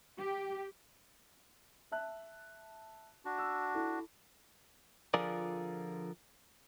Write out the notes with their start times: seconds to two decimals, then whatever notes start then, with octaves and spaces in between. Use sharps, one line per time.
0.17 G4
1.92 E5 A5 F#6
3.25 D4 F#4
3.38 E6
3.74 E4 A4
5.14 D3 F3 F4 G#4 A#4 D5